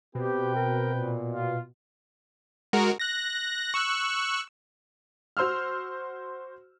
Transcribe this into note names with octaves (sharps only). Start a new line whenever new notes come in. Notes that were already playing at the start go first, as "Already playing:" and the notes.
B2 C4 G4 B4 G5
A#4
A#2
F4
G#3 F#4 A#4
F#6 A#6
C#6 E6 F#6
F#4 C5 C6 E6 F6